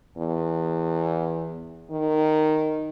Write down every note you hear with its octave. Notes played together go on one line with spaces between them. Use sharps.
E2
D#3